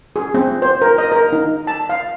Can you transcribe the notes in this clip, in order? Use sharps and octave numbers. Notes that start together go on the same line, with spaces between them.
G#4
C4
C5
A#4
D#5
A#4
D#4
A5
F5